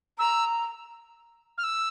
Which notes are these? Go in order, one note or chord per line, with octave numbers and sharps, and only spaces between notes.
A#5 E6
F6
E6